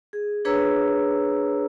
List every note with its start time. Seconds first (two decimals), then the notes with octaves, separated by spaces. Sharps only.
0.13 G#4
0.45 D4 G#4 B4 C#5 A#5 E6